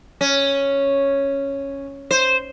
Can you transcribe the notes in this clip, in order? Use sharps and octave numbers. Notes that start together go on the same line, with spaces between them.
C#4
C5